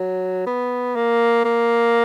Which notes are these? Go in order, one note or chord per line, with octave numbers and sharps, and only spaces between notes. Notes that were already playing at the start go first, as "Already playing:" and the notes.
Already playing: F#3
B3
A#3
A#3